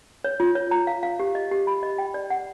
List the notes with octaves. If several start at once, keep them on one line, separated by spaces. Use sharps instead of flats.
C#5
F4
C#5
A#5
F5
F5
G4
D#5
G4
B5
D#5
G5
D5
F#5